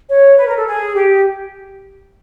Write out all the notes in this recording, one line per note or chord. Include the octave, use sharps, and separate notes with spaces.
C#5
B4
A#4
A4
G#4
G4